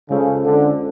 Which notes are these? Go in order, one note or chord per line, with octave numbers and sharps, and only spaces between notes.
C#3 G#3 C#4 F4 A4 C5
D3